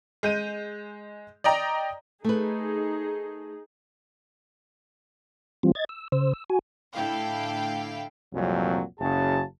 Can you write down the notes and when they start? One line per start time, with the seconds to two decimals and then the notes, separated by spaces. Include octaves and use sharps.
0.23 G#3 G6 D#7
1.44 D5 D#5 G5 A#5
2.24 A3 D#4 G#4 B4
5.63 E3 G3 C4 F4
5.75 D#5 G#6 A6
5.89 E6
6.12 C#3 C5 E6
6.33 E6
6.50 F#4 G#5
6.95 A2 D3 E4 A4 F5 G5
8.33 C2 F2 A#2 F#3
8.99 F#1 F#2 C#3 F#3 G#4 A5